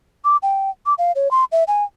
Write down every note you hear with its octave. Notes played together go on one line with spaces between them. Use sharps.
D6
G5
D6
F5
C#5
C6
E5
G#5